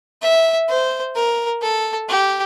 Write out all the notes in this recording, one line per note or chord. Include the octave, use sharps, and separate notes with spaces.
E5
C5
A#4
A4
G4